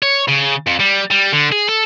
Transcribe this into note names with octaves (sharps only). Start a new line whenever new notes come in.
C#5
C#3
F2
G3
G3
D3
G#4
A4